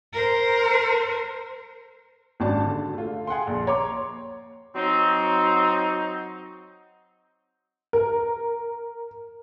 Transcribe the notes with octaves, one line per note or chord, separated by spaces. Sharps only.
A#4 C5
G#1 C#4 D4 F#4 A5
D3
A3 F4
G#4 F#5 G5 C6
A#1 D#2
C#5 A#5 C6 D6
F#3 C4 D#4
A#4